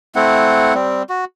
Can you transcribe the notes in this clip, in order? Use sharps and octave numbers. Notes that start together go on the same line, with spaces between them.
A3 C4 E4 F#5
G3 C4
F#4